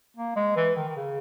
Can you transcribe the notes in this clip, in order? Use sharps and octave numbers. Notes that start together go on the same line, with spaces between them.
A#3
G#3
E3
D#3
D#3
C#3